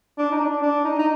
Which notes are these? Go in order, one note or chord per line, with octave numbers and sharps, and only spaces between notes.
D4
D#4
D4
D4
D#4
D#4